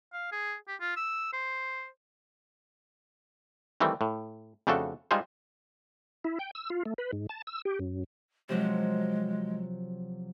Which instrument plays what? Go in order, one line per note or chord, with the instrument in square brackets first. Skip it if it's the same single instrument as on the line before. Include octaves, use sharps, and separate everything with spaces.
[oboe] F5
G#4
G4
F4
E6
C5
[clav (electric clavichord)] D#3 E3 G3 A3 C4
A2
F2 C#3 A3 D4 F#4 A4
G3 G#3 D#4 F4 G#4 C5
[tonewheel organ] E4
G5
E6
F4
A3
B4
G#2
A5
E6
G4
F#2
[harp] C3 F3 F#3 [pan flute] G#3